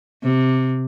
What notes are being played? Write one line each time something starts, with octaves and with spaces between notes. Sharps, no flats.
C3